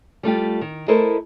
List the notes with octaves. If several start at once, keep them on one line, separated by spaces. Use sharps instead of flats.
G3 A3 F4 G4
D#3
A3 E4 A4 A#4 C5 D#5